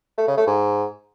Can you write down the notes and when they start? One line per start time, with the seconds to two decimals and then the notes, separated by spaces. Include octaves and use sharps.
0.18 A3
0.28 C#3
0.37 A3
0.47 G#2